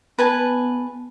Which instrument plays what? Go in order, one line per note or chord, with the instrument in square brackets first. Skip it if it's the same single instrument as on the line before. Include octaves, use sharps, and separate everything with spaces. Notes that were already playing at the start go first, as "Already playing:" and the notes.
[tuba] B3 [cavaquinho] B4 G#5 A5